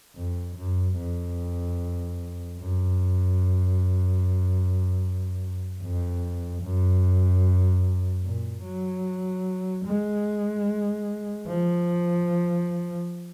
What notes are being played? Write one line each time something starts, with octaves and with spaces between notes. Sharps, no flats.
F2
F#2
F2
F#2
F2
F#2
A#2
F#3
G#3
F3